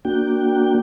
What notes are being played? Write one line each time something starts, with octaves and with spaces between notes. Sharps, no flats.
A#3 D4 F#4 G5